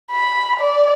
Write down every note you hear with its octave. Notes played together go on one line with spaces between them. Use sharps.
B5
D5